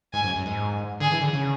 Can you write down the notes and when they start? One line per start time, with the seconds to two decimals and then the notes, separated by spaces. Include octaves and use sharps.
0.13 G#2 G#5
0.24 F#2
0.36 F#2
0.46 G#2
1.00 D3 G#4
1.12 E3
1.22 D3
1.33 C#3